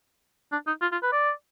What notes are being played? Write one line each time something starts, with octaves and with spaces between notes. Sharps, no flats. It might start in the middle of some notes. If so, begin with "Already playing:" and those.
D4
D#4
F4
F4
B4
D5